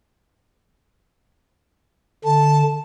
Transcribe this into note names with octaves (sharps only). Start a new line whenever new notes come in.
D3 A5